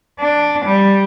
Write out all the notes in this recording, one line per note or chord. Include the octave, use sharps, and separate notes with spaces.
D4
G3